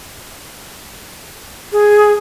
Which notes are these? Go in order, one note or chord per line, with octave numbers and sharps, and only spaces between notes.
G#4